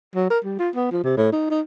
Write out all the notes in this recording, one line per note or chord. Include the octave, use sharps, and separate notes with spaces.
F#3
A#4
G3
F4
B3
F3
C3
A2
D#4
D#4